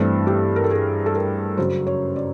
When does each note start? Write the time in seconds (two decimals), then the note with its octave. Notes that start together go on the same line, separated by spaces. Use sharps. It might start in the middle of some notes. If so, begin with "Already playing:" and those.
Already playing: G2 E3 A3 C4 A4
0.27 G4
0.56 A#4
0.64 A4
0.71 G#4
1.06 A4
1.15 A#4
1.58 F#2 C#3 F#3 C5
1.87 C#5
2.16 D5